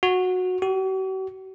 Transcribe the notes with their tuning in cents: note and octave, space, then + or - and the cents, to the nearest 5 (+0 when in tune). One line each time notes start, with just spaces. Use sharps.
F#4 -15
F#4 +45